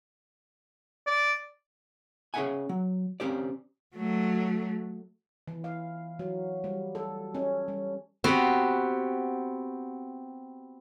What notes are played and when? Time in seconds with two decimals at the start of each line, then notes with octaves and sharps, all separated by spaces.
1.07 D5
2.34 C#4 G#4 A4 E5 F#5 G#5
2.69 F#3
3.20 C4 C#4 G4 C5 D5
3.96 F#3 A3
5.48 E3
5.64 F5
6.19 F#3
6.64 G3
6.95 A4
7.35 C#4
7.68 G3
8.24 B3 C4 F#4 G4